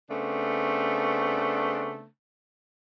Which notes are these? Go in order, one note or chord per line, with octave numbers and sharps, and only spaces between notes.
C#3 A3 B3 C4 D4